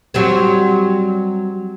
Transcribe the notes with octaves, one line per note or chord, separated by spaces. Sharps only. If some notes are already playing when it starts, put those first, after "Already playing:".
F#3 G3 C4